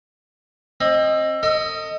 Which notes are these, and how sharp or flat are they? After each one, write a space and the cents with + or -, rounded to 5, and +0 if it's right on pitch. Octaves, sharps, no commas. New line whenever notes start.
C4 +30 D#5 +0
A4 +40 D#5 +5